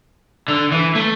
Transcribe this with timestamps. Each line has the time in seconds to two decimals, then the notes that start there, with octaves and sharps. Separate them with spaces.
0.48 D3
0.72 E3
0.95 A3